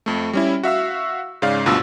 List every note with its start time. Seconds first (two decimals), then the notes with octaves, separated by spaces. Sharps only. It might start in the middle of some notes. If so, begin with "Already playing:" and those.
0.06 F2 A3
0.33 G3 C#4 E4
0.63 F#4 E5 F5 E6
1.42 G#2 C#3 D5 F5
1.66 D2 G2 B2 F4 E6